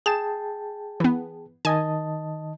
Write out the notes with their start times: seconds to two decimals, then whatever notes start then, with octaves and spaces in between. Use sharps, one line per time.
0.06 G#4 G5 A5 E7
1.00 E3 B3
1.65 D#3 D#5 G#5 A5